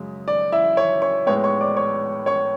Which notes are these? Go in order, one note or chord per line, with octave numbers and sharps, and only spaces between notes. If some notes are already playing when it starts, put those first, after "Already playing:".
Already playing: F#2 C#3 G#3
D5
E4 E5
C#5 C#6
C#5 C#6
A2 G#3 B3 C#5 C#6
C#5 C#6
D5 D6
C#5 C#6
C#5 C#6